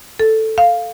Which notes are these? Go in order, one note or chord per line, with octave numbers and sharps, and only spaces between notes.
A4
F5